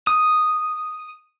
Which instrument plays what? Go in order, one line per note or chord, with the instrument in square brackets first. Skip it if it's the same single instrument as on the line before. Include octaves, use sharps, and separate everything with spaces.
[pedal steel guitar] D#6